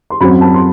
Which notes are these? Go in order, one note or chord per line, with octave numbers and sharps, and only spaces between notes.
C6
F#2 F#3 C4 B5
A5
C6